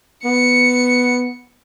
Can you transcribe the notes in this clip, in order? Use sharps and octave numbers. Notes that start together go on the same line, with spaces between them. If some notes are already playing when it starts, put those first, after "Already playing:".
B3 C#7